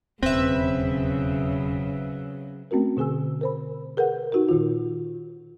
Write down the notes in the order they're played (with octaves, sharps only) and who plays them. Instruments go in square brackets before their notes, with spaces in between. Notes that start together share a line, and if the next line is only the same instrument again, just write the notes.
[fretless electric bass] E1 D#2 [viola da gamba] C#3 F#3 [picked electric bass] C4 [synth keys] B4 E5
[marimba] A3 C4 C#4 F#4 A#4
B2 D3 G#4 G#5 E6
A#4 C5 B5
G#4 A#4 B4 F#5
D#4 F#4 G4 A#4
A#2 D#3 F4